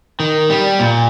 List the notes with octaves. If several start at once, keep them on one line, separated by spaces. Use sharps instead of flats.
D#3
G3
A#2